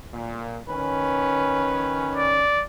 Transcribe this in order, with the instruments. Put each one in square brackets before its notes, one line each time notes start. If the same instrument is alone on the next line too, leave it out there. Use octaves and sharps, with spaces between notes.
[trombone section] A#2
[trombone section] D#3 C#4 [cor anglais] B4
[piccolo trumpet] D5